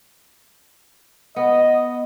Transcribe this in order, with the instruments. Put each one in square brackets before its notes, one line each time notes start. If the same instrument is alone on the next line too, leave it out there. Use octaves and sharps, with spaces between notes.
[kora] B3 [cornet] D#5